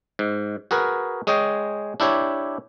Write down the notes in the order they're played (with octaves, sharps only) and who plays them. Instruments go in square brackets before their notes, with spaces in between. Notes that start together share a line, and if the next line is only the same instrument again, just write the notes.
[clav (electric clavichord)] G#2
F#4 G#4 A#4 B4
G#3 G#4 C#5 D#5 G5
D4 E4 G4 C#5